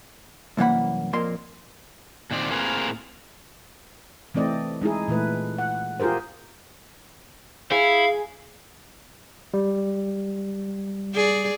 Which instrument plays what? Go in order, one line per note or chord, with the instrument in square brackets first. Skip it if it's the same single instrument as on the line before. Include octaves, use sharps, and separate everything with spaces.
[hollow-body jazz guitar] C2 F#2 E3 A#3 F#5 B5
F2 A#2 A#3 C6
[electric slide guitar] A#2 D#3 C4 D5
A2 A#3 C4 G#4 A#4 B4
[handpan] E3 A3 C4 D5 D#5
G#3 D#4 E4 G#4
A#2 E3 A3 B4
F#5
F4 G4 G#4 A#4 C5
[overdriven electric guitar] E4 [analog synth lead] G#4 [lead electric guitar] F5
[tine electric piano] G3
[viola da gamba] G#4 D5